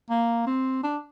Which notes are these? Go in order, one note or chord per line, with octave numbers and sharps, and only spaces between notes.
A#3
C4
D4